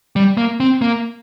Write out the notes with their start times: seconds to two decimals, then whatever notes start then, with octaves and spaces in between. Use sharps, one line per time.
0.16 G3
0.37 A#3
0.60 C4
0.82 A#3